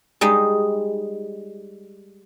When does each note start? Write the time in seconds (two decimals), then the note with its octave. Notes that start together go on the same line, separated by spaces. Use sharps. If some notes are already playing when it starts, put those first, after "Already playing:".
0.21 G3 G#3 D#4